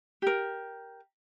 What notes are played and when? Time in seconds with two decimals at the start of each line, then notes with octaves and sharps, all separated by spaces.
0.22 G4 A#4